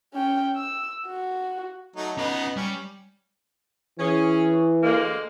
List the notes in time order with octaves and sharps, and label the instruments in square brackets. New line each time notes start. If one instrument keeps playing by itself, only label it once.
[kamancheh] C#4 G5
E6
F#4
[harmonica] F#3 A3 D#4
[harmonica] B3 D#4 [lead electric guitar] C#4 D#5
[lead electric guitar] G3 [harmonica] C#4
[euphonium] E3 [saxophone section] C#4 G#4
[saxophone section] D2 G#3 A#3